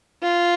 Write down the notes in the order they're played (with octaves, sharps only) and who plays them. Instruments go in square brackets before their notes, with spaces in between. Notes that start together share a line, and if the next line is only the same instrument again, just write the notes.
[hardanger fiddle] F4